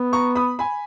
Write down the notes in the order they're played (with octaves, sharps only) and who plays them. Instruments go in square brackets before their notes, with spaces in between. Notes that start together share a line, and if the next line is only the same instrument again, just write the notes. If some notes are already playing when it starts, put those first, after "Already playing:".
Already playing: [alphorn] B3
[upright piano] A#5 C#6
B5 D#6
G#5 B5